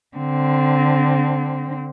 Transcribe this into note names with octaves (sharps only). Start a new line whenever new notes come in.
D3 C4